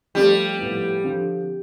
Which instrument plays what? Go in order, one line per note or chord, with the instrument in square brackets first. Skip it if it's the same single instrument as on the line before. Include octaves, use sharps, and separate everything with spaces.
[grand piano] F3 A3 C4 G4 [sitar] G3
[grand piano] A2 F3 B3
D3 F3 C4